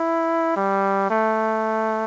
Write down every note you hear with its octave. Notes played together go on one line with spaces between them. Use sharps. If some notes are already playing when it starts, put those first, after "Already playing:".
Already playing: E4
G3
A3